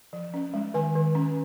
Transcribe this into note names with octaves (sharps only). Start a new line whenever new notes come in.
F3
C#4
G#3
D#3 G#5
D#3
C#4